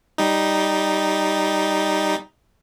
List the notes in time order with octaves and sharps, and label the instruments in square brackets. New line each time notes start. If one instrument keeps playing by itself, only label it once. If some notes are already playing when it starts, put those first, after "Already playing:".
[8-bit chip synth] G3 D#4